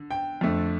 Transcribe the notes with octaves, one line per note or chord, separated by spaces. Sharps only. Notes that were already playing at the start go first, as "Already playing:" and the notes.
Already playing: D3
G5
F2 D3 A3